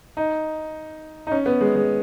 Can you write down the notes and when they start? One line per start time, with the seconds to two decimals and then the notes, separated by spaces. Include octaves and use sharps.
0.17 D#4
1.27 D#4
1.32 C#4
1.46 B3
1.61 G#3
1.75 G#3